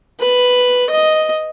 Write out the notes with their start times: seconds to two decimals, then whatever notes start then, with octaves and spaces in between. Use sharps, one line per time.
0.20 B4
0.90 D#5